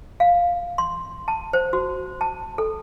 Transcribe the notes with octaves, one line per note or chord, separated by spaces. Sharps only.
F5
C6
A5
C5
F#4
A5
A4